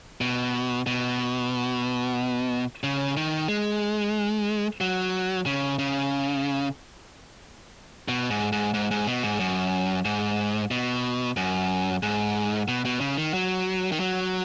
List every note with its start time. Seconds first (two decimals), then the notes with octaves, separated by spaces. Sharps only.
0.21 B2
0.87 B2
2.83 C#3
3.17 D#3
3.48 G#3
4.81 F#3
5.46 C#3
5.79 C#3
8.08 B2
8.30 G#2
8.52 G#2
8.74 G#2
8.91 G#2
9.07 B2
9.23 G#2
9.40 F#2
10.05 G#2
10.71 B2
11.37 F#2
12.03 G#2
12.68 B2
12.85 B2
13.00 C#3
13.17 D#3
13.34 F#3
13.92 D#3
14.00 F#3